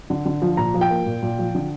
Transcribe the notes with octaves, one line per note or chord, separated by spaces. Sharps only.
D3
D3
F3
A#2 A#5
F3
G5
A#3
A#2
A#2
F3
D3